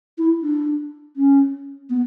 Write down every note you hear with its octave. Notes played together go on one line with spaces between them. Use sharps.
E4
D4
C#4
B3